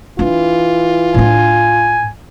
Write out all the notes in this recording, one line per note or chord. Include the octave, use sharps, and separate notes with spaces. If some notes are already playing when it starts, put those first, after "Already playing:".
E3 D4 E4 F4
A2 D4 G#5